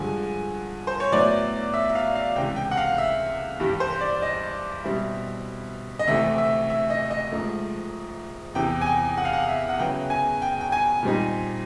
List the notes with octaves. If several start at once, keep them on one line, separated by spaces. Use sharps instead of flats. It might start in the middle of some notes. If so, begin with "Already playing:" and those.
Already playing: G2 D3 F3 G#3 G#5
C5
C#5
A2 F#3 B3 E4 D5
E5
E5
F5
F5
C#2 C3 E3 G5
G5
F#5
F5
E5
G2 E3 G3
C5
D5
D#5
B2 G3 C4 E4
D#5
D2 C3 E3 A3 E5
E5
E5
D#5
D#5
G#2 F3 A3
E2 C3 E3 G5
G#5
G5
F#5
F5
F#5
E5
F#5
C#3 F#3 B3 E4 G5
G#5
G5
G5
G#5
A#2 G3 C4 D#4